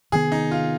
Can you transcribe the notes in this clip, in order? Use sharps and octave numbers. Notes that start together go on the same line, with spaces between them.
C3 D#3 B3 G#4
D#4
F4